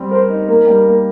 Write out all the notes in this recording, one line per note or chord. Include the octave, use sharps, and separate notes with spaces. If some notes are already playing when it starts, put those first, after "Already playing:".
Already playing: G3 C4
A#4 C5
D#4
A#3 A#4
G3
A#3